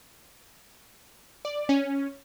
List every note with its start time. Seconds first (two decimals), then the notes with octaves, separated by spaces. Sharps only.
1.45 D5
1.69 C#4